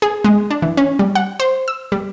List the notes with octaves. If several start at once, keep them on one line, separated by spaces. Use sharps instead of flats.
G#4
G#3
D4
E3
C#4
G3
F#5
C5
E6
G3